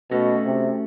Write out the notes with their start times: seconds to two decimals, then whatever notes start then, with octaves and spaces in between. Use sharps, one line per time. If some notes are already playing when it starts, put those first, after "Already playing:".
0.11 B2 A3 C#4 F#4 A4
0.45 C3